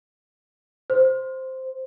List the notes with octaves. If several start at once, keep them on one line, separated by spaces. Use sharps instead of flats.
C5